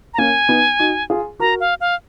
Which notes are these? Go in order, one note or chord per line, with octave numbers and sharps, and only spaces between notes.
A#5
A#3 C#4 G#5
B3 D#4
D#4 F#4
F4 G#4
F#4 A#4 A#5
F5
F5